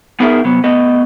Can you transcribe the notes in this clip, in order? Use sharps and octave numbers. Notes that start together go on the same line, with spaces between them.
B3 D#4 G#4 A#4 D5 E5
C3 F#3 B3
A3 B3 D#5